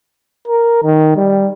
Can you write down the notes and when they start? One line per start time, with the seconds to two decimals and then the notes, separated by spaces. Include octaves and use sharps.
0.48 A#4
0.84 D#3
1.16 G3